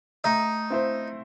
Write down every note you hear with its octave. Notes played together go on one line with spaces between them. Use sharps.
A3 D#4
C4 E4 C5